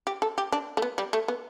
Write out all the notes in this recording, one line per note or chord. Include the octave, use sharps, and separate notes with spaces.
G4
A4
G4
D4
A3
B3
G3
A3
B3